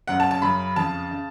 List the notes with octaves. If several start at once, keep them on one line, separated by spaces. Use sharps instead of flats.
F#2 C#3 F#5
A5
A5
F#2 C#3 B5
F2 C#3 A5
C#3